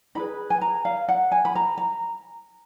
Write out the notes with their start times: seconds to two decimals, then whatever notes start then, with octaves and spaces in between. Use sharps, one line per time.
0.15 D#4 G#4 B4 B5
0.50 G#5
0.61 A#5
0.85 F5
1.08 F#5
1.32 G#5
1.45 B5
1.55 A#5
1.78 A#5